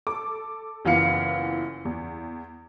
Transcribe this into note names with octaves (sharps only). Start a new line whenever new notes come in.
A4 D6
F#1 E3 B3 F4 F5 C#7
E2